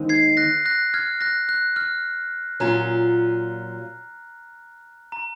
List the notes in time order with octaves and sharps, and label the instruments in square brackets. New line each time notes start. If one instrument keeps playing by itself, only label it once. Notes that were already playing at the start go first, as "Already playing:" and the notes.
Already playing: [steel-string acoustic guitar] D#2 D#3 G#3 C4 D#4
[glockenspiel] G#6 C7
F#6 A#6
F#6 A#6
F6 G#6
F#6 A#6
F#6
F6
[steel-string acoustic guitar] A#2 F#3 C#4 F4 [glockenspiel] A#5
[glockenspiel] A#5